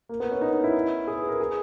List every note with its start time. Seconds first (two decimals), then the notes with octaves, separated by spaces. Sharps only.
0.09 A#3
0.20 B3
0.31 C#4
0.42 D#4
0.53 D#4
0.64 E4
1.07 G#4
1.18 B4
1.29 A#4
1.40 G#4